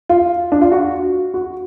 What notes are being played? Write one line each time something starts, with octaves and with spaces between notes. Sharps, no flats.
F4
D4
F4
F#4
F#4